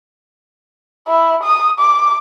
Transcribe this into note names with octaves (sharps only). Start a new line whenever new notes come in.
E4
D#6
D6